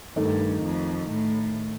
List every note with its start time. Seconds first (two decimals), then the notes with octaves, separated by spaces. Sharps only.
0.16 G2 D#3 A3 D#4
0.63 F2
1.10 A2